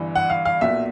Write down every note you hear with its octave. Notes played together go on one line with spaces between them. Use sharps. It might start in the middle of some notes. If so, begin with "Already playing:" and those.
Already playing: G1 G2 E3
F#5
F5
F5
B1 A#2 E5